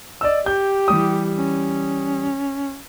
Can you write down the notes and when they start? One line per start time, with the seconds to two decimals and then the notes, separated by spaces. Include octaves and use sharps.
0.21 D5 D#5 E6
0.46 G4 G6
0.88 E3 G3 D#6
1.38 C#4